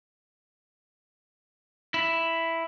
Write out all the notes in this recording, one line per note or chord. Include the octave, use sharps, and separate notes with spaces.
E4